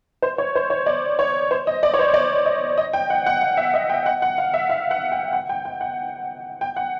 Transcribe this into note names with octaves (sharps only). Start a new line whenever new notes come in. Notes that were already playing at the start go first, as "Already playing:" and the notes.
C5
C#5
C5
C#5
D5
C#5
C5
D#5
D5
C#5
C5
D5
D#5
D#5
G5
F#5
F#5
F5
E5
D#5
G5
F#5
F#5
F5
E5
F5
F#5
G5
F#5
G5
G5
F#5
G5
F#5